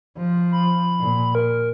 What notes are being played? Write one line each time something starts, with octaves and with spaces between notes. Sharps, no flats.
F3
B5
A#2
A#4